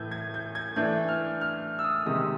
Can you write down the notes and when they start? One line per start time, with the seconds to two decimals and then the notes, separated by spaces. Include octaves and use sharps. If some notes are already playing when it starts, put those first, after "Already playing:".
Already playing: A2 E3 A3 G6 G#6
0.11 G#6
0.34 G6
0.55 G#6
0.76 E3 A3 D4 G6
1.08 F6
1.41 F6
1.79 E6
1.84 D#6
2.06 C3 D#3 G#3 D#6